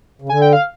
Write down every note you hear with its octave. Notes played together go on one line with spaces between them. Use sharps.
C#3
D3 G#5
G5
F5